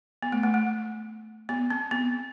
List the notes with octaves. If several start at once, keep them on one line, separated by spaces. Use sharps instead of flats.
B3
A3
A3
A3
B3
C4
B3